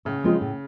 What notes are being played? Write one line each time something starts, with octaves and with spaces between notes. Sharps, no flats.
A2 C#3
F3 G#3 C4 F4
A2